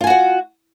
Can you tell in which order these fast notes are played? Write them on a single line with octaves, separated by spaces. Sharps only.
F4 G#5 F#4 F#5